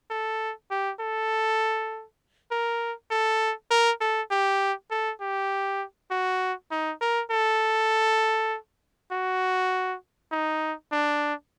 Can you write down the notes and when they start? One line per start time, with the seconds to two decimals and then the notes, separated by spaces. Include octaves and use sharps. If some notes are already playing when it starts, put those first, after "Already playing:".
0.10 A4
0.70 G4
1.00 A4
2.51 A#4
3.11 A4
3.71 A#4
4.01 A4
4.31 G4
4.91 A4
5.21 G4
6.11 F#4
6.71 D#4
7.01 A#4
7.31 A4
9.12 F#4
10.32 D#4
10.92 D4